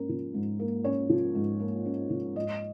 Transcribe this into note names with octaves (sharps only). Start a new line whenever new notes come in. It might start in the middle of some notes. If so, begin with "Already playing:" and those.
Already playing: G#2 A#3 C#4 A#4
F3
G#2
A#3
C#4 C#5
F3
G#2
A#3
C#4
F3
G#2 D#5